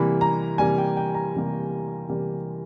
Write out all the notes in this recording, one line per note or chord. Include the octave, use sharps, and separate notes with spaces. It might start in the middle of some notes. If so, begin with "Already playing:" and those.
Already playing: C3 E3 G3 A#3 B5
A#5
C3 E3 G3 A#3 G#5
G5
G5
A#5
C3 E3 G3 A#3
C3 E3 G3 A#3